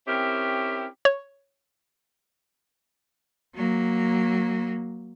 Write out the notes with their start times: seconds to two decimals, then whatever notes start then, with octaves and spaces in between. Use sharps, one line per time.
0.07 C4 C#4 E4 G4 A#4
1.05 C#5
3.56 F#3 A#3